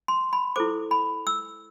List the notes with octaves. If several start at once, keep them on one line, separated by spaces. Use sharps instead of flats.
C6
B5
E4 A4 C5 D6
B5
E6